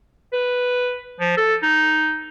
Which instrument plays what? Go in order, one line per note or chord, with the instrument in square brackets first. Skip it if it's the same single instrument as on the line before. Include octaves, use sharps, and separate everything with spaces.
[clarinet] B4
F3
A4
D#4